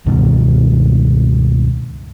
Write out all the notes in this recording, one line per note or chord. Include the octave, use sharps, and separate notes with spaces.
C#2 G2 B2 D#3